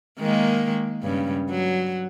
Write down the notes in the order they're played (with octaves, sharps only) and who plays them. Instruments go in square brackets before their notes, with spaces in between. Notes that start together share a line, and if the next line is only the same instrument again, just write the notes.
[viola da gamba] D#3 G#3 A#3
G2 C#3
F#3